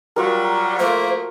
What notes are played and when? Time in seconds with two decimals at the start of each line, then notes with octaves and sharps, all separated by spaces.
0.16 F#3 G3 F4 F#4 A#4
0.79 F3 A3 A#3 C5